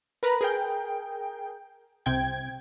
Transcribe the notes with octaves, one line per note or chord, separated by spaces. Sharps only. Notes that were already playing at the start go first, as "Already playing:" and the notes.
A#4 B4 A#5 B5
G#4 A#4 G5
C2 C3 G5 G#6